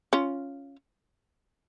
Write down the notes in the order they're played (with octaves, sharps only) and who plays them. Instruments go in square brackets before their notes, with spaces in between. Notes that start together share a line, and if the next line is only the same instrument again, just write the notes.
[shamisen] C#4 F4